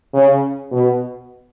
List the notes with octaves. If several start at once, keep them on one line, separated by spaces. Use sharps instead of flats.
C#3
B2